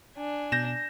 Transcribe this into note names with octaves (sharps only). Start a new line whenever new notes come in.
D4 G#5
B2 G6 A#6 E7